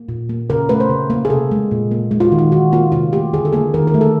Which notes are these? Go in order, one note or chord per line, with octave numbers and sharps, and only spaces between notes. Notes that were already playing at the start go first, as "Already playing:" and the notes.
Already playing: A#3
A#2
A#3
C#3 A#4
A3 B4
C5
C#3
A#3
G#4
C3 A4
G#3
A#2
A#3
G#3
F4
F#4
D#3
F4
D#3 F#4
A#3 F4
C3 F4
A3 G4
D3 G#4
A4
A#3 G#4
D#3 A#4
A#4
A3
A4